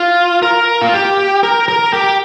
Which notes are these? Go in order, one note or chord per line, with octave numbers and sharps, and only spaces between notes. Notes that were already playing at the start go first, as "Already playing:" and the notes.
Already playing: F4
A#4
F4
G4
A#4
A#4
G4